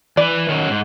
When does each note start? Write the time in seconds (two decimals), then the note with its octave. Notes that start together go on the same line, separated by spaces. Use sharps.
0.17 E3 B4 D5
0.49 D#3 F#3 C#4
0.70 G#2